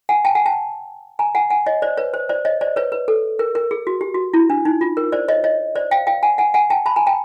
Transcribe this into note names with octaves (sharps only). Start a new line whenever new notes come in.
F#5 G#5
G5 A5
F#5 G#5
G5 A5
G#5 A#5
F#5 G#5
F#5 G#5
C#5 D#5
C5 D5
B4 C#5
C5
C5 D5
C#5 D#5
C5 D5
B4 C#5
B4
A4
A#4
A#4
G#4
F#4
G4
F#4
E4
D4
D#4
F4
A#4
C5 D5
C#5 D#5
C#5 D#5
C5 D5
F5 G5
F5 G5
F#5 G#5
F#5 G#5
F#5 G#5
G5 A5
A5 B5
G#5 A#5
G5 A5